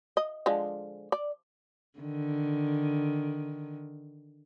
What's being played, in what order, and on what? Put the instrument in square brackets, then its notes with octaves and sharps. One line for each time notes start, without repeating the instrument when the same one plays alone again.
[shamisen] D#5
D3 F3 G#3
D5
[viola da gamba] D3 D#3